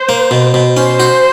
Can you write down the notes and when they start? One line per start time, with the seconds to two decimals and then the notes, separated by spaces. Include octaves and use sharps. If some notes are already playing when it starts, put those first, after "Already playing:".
Already playing: C5
0.09 A#3
0.31 B2
0.54 B2
0.77 C#4 C5
1.00 F#4